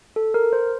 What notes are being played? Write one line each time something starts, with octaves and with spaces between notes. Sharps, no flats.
A4
A#4
C5